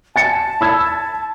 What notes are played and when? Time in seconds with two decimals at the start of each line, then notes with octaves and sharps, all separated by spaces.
0.16 G#5 A5 A6 C#7
0.61 B5 E6 G#6